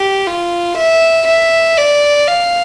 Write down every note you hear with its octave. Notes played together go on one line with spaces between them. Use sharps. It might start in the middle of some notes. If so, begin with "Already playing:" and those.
Already playing: G4
F4
E5
E5
D5
F5